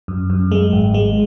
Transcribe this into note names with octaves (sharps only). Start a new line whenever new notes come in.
F#2
F#2
G#3
G#1
G#3